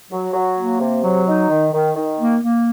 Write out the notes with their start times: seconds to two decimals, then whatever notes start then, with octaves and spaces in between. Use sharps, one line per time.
0.11 F#3
0.34 F#3
0.58 A#3
0.80 C3
1.03 F#3
1.27 D#4
1.50 D#3
1.73 D#3
1.96 D#3
2.19 A#3
2.43 A#3